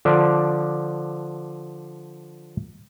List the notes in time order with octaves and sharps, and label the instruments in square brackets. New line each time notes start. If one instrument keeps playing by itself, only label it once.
[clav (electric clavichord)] D3 F3 D4